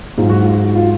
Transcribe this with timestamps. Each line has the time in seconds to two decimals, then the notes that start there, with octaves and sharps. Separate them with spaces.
0.18 G#2 F#3 F4
0.30 F#4
0.43 F4
0.64 F#4
0.75 F4